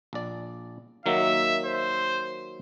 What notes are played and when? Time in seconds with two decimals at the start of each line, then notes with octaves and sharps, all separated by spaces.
0.13 A#1 D5
1.06 D#3 F#3 A#3 E5
1.65 C5